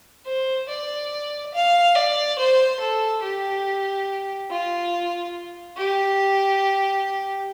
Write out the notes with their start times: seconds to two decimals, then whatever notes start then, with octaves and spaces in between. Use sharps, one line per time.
0.26 C5
0.68 D5
1.54 F5
1.95 D5
2.39 C5
2.80 A4
3.22 G4
4.50 F4
5.77 G4